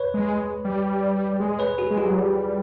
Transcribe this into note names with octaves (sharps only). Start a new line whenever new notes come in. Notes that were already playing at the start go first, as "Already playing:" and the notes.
Already playing: B4 C#5
G#3
G3
G#3
B4 C#5
F#4 G#4
G#3
F4 G4
F#3
G3